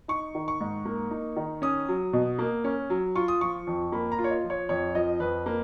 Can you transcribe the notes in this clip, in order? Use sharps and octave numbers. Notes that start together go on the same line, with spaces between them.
D#4 C#6
D#3
C#6
G#2
A#3
D#4
D#3
C#4 D#6
F#3
B2
A#3
C#4
F#3
F4 C#6
D#6
F3 C#6
F2
A#3 B5
A#5
F4
C#5
D#5
F3
C#5
F2 C#5
F3 D#5
F2 B4
A#3